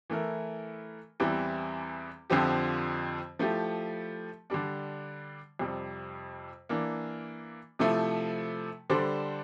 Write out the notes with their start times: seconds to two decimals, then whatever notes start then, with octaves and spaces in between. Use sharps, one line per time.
0.10 E3 A3 E4 A#4
1.20 E2 E3 G3 C4 E4
2.30 F2 D3 F3 C4 G4
3.39 F3 A3 E4 G4
4.50 D3 G3 D4
5.59 F2 C3 G3
6.69 E3 A#3 D4
7.79 C3 F3 A3 E4
8.90 D3 G3 D4 A4 C5